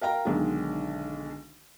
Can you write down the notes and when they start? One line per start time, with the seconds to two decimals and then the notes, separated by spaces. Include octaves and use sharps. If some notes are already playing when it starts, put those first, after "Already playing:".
0.01 A#4 F5 G5 A#5
0.25 B1 D3 D#3 G#3